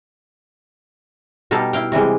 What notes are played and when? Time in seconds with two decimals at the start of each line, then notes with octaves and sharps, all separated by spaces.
1.51 B2 G3 D#4 A4 F5
1.73 E4 F5 G5
1.92 C3 E3 G3 G#3